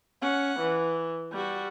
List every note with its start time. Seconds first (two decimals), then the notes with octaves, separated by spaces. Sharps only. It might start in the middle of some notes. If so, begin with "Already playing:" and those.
0.22 C#4 F#5
0.60 E3
1.32 G3 F#4